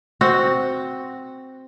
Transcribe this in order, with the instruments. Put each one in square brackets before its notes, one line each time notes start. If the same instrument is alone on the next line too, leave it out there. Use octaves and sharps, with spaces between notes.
[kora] C4 F#4